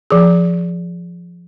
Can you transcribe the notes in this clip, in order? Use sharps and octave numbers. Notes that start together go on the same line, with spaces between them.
F3 G#4